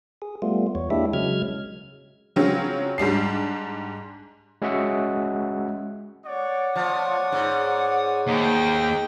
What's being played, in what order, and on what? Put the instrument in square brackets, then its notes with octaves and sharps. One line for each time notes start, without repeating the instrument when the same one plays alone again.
[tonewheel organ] G#4
G3 A3 B3 F4
E2 C#5
G#3 A#3 D4 E4 G4 E5
C#3 F#3 G#3 F6 G#6
[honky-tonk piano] C#3 F#3 C4 C#4 F4
G#2 G3 D4 C7
[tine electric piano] G#3 C#4 F#4 G#4 E5 F#5
[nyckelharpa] C#5 [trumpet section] D5 F#5
[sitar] F3 [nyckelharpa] C#5 D#6
[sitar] G#2
[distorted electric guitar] D#2 [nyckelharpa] G5 A#5